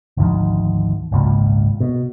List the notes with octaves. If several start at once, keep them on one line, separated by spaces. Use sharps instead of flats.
G#1 D2 D#3 F3
G#1 C#2 A#2
B2